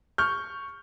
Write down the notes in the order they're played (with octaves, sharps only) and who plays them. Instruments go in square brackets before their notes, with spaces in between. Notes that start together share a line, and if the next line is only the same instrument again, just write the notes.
[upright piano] C#6 F6 G6